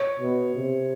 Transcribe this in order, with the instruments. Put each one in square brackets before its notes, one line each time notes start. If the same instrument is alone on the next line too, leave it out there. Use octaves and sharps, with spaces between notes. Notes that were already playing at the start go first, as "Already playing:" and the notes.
Already playing: [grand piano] C#5
[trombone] B2
C3